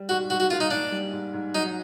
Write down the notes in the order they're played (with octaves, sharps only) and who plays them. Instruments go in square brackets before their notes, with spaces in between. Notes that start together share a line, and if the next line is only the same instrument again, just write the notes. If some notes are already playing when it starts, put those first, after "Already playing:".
Already playing: [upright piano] G3
[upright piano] G#2 [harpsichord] F#4
[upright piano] G#2 [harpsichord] F#4
[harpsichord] F#4
[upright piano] A#3 [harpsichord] F4
[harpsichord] D#4
[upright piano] G#2 [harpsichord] D4
[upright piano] G3
G#2
G#2
[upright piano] F#3 [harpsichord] D#4